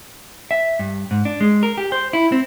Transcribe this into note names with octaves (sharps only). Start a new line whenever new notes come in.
E5
G2
G#2
D4
G#3
A#4
G4
C5
E4
C4